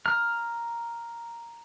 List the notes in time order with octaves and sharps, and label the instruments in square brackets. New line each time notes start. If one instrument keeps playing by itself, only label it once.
[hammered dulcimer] A#5 [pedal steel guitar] F6